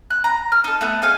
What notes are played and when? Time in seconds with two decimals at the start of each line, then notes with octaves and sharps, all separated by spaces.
0.10 F#6
0.24 A#5
0.52 F6
0.64 D#4 A4
0.81 A3 B3 G6
1.02 D#4 G#4 F5 G#5